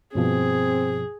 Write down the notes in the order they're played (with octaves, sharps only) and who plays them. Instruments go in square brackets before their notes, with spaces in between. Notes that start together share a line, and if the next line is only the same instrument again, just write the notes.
[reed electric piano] G2 B2 F3 [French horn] C4 [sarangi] G#4